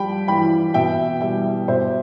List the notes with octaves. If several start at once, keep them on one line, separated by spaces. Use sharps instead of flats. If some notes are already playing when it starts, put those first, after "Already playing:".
Already playing: F3 G3 G5 B5
E3 G5 B5
B2 E5 G5
G3 E5 G5
B2 C5 E5